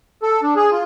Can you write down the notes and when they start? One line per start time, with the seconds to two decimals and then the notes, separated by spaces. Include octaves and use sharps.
0.22 A4
0.43 D4
0.56 G#4
0.72 F4